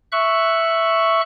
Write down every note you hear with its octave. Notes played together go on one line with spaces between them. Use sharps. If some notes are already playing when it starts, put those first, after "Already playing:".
E5 C#6 F#6